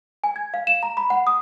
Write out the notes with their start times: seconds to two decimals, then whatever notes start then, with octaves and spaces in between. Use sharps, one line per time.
0.24 G#5
0.36 G#6
0.54 F5
0.67 E7
0.83 A#5
0.97 B5
1.10 F#5
1.27 D#6